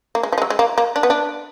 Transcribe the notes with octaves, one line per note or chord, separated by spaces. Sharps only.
A#3
G#3
F3
G#3
F#3
G#3
A#3
A#3
D4
B3
D4